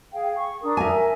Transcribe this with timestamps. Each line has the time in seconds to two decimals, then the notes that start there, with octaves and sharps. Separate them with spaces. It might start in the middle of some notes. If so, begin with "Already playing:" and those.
0.13 G#4 F5 G5
0.35 C#6
0.61 D4 A#4 D#6
0.77 A#4 E5 G#5